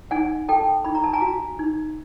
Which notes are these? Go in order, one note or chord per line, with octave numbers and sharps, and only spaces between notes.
D#4 F#5 G#5
A4 G5 A5
D#4 B5
A#5
A5
G#5 A#5
F#4
D#4